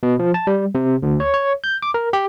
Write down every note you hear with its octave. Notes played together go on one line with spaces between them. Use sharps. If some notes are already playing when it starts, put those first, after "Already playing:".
B2
F3
A5
G3
C3
D2
C#5
C#5
G6
D6
A#4
G4